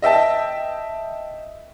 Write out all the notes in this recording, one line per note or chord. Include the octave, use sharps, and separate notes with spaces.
D#5 E5 G5 A5